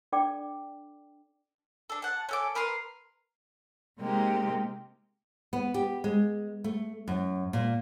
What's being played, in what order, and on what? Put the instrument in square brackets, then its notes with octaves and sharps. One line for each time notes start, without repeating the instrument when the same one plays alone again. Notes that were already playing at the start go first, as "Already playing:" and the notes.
[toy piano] D4 A4 D5 G5 D6
[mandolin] D4 A4
F#5 A5
C#4 A4 D6
A#4 B4 A#5 C6
[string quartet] C3 G#3 A#3 D#4 G4
[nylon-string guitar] B3
G4
G#3
A3
F#2
A#2